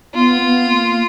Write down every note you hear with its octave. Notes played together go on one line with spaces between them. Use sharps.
B3 F4
B3
A#3